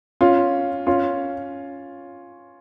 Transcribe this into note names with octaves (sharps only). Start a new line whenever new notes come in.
C#4 F4
C#4 F4